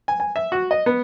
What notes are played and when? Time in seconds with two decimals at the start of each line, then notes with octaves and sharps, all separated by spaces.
0.08 G#5
0.20 G#5
0.36 E5
0.52 F#4
0.71 D#5
0.86 B3